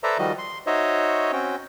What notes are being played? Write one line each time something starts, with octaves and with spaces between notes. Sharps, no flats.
A4 B4 C5 D5 E5 A#5
D#3 F3 G3 F#4 D#5
C6
D#4 F#4 C5 C#5 D#5 E5
C4 C#4 F#4 G5